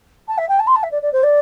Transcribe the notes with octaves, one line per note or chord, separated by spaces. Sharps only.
A5
E5
G5
A5
C6
A5
E5
D5
D5
C5
D5